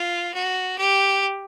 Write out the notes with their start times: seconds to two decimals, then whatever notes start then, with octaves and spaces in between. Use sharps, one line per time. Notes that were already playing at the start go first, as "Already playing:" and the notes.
Already playing: F4
0.34 F#4
0.78 G4